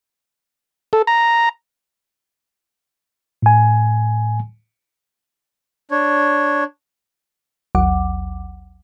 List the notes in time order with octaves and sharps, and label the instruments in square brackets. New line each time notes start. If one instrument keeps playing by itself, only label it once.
[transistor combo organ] A4
A#5
[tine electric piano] A2 G#5
[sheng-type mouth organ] D4 C#5
[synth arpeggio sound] A1 D#2 F#3 F#5 D6